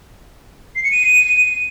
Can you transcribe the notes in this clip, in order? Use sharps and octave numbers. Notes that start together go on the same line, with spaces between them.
C7
C#7
D#7